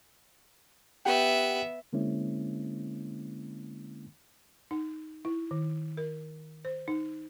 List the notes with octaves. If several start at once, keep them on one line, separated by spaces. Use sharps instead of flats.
B3 G4 E5 F#5 G5
D3 G#3 A#3 C4 C#4 E4
D#4
E4
D#3
A#4
C5
D#4